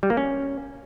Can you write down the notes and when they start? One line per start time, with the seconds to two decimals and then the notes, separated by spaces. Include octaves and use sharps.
0.03 G3
0.10 A#3
0.17 C#4